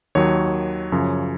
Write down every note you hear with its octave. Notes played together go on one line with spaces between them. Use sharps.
D#2 D#3 F#3 C#5
F#2 C#3 F3